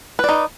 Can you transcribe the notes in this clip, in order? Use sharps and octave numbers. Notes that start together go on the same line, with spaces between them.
D#4 B4 D5